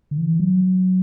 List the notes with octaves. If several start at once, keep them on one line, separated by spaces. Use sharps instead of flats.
D3
E3
F#3